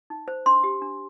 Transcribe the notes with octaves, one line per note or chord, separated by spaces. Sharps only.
D#4
C5
D4 C6
G4
D4